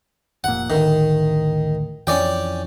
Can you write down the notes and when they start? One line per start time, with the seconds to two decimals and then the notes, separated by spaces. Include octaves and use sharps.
0.44 F1 A#2 F#5
0.70 A1 D2 D#3
2.07 F2 E3 C#4 D5 G5